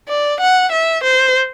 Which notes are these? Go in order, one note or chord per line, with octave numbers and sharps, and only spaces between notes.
D5
F#5
E5
C5